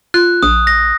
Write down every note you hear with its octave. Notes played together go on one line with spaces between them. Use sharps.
F4 F#6
A#1 D#6
A#6